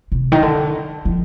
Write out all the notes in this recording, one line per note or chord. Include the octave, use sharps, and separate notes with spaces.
C3
D#3
D3
F3